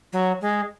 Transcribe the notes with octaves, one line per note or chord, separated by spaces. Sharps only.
F#3
G#3